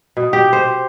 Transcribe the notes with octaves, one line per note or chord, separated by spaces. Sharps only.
B2
G4
C5